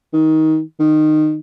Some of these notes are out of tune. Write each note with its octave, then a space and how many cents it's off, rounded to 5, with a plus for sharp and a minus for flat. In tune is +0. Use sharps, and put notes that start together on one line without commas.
D#3 +20
D#3 -20